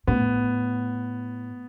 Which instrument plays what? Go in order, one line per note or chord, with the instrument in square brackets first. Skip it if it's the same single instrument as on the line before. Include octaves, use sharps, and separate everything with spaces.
[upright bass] A2 [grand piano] B3